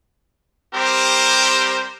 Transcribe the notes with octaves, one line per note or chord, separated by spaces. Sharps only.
G3 C4 G4 A#4 C5